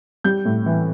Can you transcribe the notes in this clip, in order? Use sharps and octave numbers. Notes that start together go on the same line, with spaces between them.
G3 G6
A2
E3